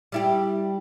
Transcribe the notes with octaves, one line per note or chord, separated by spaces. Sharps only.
G3 E4 G4